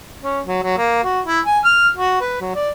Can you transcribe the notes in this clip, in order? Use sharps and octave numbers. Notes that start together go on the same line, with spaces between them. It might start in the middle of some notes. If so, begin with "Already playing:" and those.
C#4
F#3
F#3
A#3
F#4
E4
G#5
F6
F#4
B4
F#3
D5